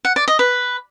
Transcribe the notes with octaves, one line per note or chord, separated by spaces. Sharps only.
F#5
D5
D#5
B4